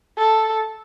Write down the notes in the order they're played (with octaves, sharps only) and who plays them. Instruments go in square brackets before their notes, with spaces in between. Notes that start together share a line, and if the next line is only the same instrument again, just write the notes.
[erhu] A4